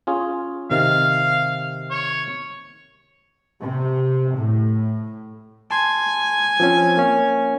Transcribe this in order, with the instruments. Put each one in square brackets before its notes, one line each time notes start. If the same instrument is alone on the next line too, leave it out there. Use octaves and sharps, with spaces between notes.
[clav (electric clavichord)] C#4 F4 G#4
[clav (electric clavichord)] C3 D#3 [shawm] F5
[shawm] C#5
[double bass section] C3
A2
[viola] G#5 [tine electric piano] A5 C6
[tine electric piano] F3 C4 C#4
A#3 C#4